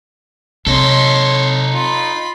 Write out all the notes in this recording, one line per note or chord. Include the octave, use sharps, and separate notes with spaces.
C3 D#4 A4 C#5 C6
F4 B5